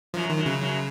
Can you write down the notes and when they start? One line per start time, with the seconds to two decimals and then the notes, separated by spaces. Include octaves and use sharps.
0.14 F#2 F3 F#3
0.30 D#3
0.37 F#2 F#3
0.46 C#3
0.61 F#2 F#3